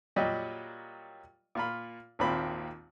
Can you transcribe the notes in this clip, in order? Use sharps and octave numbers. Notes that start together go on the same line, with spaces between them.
A#2 F#3 G3 D#5 G5
A#2 F4 B5
G#1 D#2 A#2 D#3 C4 B5